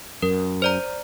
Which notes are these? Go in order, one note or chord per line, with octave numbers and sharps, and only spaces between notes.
F#2 A#4
C5 D5 A#5